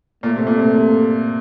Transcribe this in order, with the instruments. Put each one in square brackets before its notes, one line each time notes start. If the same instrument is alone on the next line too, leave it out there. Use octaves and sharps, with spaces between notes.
[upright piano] A#2 [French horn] A3
[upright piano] C3
A#2
C3